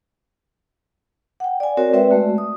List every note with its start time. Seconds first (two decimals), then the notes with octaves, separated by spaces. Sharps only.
1.40 F#5 G5
1.60 D5 G#5
1.77 C4 F#4 A#4 C#5 D5
1.93 G#3 C4 B4 D5 E5 G5
2.11 G#3 A3 F#4
2.38 D#6